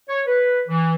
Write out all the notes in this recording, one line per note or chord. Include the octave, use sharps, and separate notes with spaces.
C#5
B4
E3